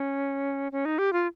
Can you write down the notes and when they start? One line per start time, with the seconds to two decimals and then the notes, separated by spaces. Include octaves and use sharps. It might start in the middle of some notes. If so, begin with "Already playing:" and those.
Already playing: C#4
0.72 C#4
0.85 D#4
0.98 G4
1.13 F4